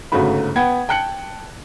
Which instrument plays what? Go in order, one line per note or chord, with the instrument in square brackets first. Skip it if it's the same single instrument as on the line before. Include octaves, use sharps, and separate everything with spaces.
[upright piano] G1 G#2 C#3 A3 F#4 B5
B3 F#5 G5 G#6
G5 A5 F#6 C#7 F#7